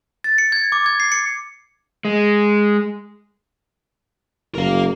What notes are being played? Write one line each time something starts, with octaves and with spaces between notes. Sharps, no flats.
A6
C#7
G#6
D6
G#6
C7
C#7
G#3
F#1 A#4 F5